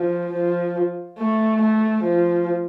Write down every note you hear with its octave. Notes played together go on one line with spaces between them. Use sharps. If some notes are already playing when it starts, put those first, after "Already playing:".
Already playing: F3
F3
A3
A3
F3